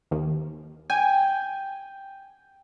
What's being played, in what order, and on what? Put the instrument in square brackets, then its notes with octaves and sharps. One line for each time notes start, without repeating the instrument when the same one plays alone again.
[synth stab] D#2
[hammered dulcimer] G5 [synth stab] G#5